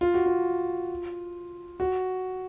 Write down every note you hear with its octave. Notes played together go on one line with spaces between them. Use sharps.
F4
F#4
F4
F#4